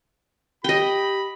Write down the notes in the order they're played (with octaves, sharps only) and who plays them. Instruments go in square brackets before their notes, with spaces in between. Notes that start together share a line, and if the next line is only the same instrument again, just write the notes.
[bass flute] G4 [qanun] D#5 G5 [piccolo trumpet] B5